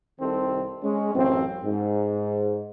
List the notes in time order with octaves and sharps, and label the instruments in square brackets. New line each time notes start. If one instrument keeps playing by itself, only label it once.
[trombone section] C2 C3 D#3 C4 A4
G#3 C#4
A1 F#2 C4
G#2